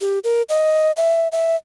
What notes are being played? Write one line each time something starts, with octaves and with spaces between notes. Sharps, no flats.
G4
A#4
D#5
E5
E5